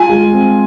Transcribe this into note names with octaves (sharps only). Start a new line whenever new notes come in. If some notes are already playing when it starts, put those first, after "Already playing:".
Already playing: F4 G#5
G#3
C4